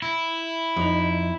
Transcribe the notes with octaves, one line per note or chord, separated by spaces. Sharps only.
E4
F2 D#4